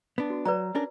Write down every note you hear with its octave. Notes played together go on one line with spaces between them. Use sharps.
B3 D4
F#4
F#3 B4 D5 A#5
C#4 D4 A#4